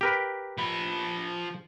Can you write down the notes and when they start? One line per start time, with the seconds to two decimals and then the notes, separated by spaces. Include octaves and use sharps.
0.01 G4 A#4 B4
0.58 F3 B5